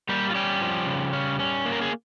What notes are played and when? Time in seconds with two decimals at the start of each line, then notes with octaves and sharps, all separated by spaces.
0.09 G3 A#3 G4
0.30 F4
0.34 G3 C#4 G4
0.61 F3
0.87 C#3
1.13 C#4
1.40 C#4
1.66 A#3
1.72 A#4
1.81 G#4